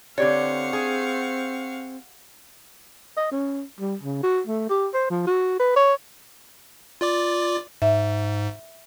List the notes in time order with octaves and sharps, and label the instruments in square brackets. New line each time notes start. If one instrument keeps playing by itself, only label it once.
[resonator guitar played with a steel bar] D3 G4 C#5 [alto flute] C4 [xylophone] D5 [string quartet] F5 F#5 C#6
[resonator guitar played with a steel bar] G#4
[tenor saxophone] D#5
C#4
G3
C#3
F#4
A3
G4
C5
F3
F#4
B4
C#5
[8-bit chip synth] F4 D5 D6
[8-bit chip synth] G#2 [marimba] E5